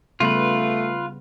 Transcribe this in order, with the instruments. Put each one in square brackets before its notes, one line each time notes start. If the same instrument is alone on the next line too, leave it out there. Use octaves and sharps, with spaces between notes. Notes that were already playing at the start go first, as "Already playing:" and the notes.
[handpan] C#3 G3 B3 [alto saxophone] A3 [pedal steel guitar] F4 B4